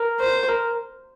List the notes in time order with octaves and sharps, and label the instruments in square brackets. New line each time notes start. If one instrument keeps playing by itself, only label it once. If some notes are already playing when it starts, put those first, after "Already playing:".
Already playing: [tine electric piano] A#4
[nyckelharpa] C5
[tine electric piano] A#4